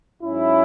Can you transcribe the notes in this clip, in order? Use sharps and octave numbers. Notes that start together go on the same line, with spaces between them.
G#2 F#3 C#4 E4